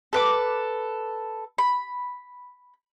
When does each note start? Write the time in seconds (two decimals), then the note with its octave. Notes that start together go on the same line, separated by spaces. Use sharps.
0.13 A4 B4 D6
1.58 B5